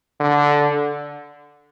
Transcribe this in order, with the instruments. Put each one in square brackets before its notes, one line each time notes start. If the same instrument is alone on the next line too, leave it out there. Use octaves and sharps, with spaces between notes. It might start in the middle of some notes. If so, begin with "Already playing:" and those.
[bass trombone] D3